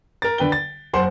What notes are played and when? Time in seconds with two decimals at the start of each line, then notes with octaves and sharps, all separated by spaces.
0.22 A#4 A6
0.38 D3 B4 G5 G7
0.52 A6
0.94 F#1 C5 F#5 C6